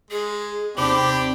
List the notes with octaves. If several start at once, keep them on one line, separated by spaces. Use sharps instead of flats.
G#3 G#4
D#2 C3 C4 D4 G4 B5 D6